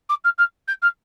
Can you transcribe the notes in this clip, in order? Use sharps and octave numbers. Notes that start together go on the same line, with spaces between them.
D6
F6
F6
G6
F6